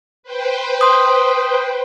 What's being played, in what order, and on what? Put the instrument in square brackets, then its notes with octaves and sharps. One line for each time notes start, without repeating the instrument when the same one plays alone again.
[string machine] B4 C5 G5
[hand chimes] C6 D#6